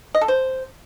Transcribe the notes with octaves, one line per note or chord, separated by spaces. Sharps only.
D#5
A4
C5